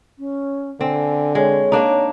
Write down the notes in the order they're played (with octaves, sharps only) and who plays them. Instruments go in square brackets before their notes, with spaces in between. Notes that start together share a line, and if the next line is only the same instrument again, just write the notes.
[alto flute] C#4
[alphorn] D3 [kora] C4 [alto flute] G#5
[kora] G#3 [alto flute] C#5
[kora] A#3 D4 D#4